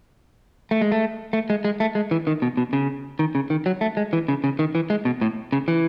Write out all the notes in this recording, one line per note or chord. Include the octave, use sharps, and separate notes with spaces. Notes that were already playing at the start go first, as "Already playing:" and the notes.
A3
G#3
A3
A3
G#3
G#3
A3
G#3
E3
D#3
B2
B2
C#3
D#3
C#3
D#3
F#3
A3
G#3
E3
C#3
C#3
D#3
E3
G#3
B2
A2
C#3
E3